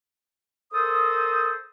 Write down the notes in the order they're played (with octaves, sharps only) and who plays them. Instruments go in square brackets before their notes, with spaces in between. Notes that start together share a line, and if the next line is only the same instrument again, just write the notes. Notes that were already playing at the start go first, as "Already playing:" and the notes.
[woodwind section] A4 A#4 C5 D#6